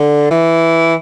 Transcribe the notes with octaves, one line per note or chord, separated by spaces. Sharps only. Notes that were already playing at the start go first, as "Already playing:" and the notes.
Already playing: D3
E3